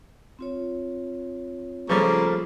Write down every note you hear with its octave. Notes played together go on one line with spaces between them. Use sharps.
C4 F4 C#5
C#3 F3 G3 A3 A#3